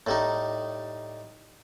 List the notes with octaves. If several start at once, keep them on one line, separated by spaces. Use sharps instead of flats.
A2 G3 D#4